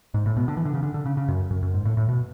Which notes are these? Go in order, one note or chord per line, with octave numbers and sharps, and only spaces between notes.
G#2
A2
B2
D3
E3
D3
C#3
D3
D3
C#3
C#3
F#2
F#2
F#2
G#2
A2
A2
B2